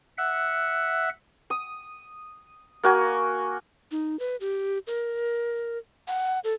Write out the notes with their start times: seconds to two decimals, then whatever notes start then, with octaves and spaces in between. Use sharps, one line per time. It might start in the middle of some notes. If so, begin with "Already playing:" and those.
0.18 E5 F#5
1.50 D#6
2.83 A#3 F#4 G#5
3.91 D#4
4.19 B4
4.41 G4
4.87 A#4
6.08 F#5
6.44 A4